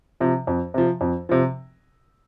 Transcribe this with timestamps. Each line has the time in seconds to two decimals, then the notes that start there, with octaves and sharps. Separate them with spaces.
0.20 C3 F3
0.47 F2
0.74 C3 F3
1.01 F2
1.29 C3 F3